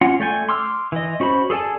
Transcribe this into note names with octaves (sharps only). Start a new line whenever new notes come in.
C#4 F4 F#5
A3 D5 G5 G#5
C6 D6 E6 F6
E3 D#5
C#4 F#4 C5 B5
G#4 A4 D5 G#5 A5